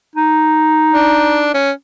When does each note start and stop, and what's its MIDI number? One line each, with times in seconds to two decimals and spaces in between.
0.16 1.54 63
0.92 1.52 62
1.54 1.71 61